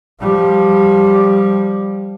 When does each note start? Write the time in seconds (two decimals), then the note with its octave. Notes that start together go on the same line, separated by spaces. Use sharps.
0.21 F3 G3